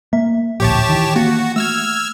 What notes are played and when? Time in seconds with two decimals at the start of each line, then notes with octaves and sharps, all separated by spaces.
0.13 A#3 E5
0.60 D1 A#1 G4 C#5 A5
0.89 D#3 E3
1.16 A#3 F#4
1.56 A3 E6 F6 G#6